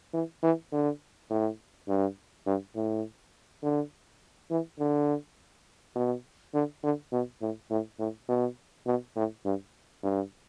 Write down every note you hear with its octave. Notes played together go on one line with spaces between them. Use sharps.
E3
E3
D3
A2
G2
G2
A2
D3
E3
D3
B2
D3
D3
B2
A2
A2
A2
B2
B2
A2
G2
G2